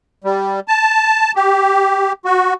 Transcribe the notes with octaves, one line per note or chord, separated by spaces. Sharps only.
G3
A5
G4
F#4